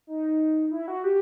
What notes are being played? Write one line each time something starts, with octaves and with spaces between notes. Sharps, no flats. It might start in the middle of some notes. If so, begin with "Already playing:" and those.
D#4
E4
F#4
G4